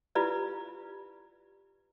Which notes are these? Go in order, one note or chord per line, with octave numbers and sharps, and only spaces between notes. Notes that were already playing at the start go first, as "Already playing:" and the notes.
E4 F4 G4 B4 D5